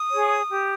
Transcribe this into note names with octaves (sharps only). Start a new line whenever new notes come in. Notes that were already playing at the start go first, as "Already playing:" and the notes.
Already playing: D#6
G#4 C#5
G4